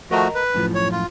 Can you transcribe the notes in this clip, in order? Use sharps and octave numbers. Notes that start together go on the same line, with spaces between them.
F3 A3 F#4 A#4 D#5 A#5
B4
F#2 A2 F3
C#5
F4